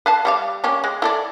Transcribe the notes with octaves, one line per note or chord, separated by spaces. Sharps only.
B4 F5 A5
G3 D5 F5
A#3 C#4 G4
G#3
E4 A4 D5